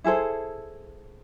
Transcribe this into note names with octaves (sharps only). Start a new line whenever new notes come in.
E4 G#4 A4 C5